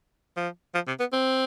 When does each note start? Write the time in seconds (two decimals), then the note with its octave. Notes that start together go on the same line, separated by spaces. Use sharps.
0.37 F3
0.75 F3
0.87 C3
1.00 B3
1.13 C4